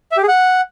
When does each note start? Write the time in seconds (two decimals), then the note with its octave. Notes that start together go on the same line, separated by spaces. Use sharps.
0.12 E5
0.17 G4
0.23 G#4
0.28 F#5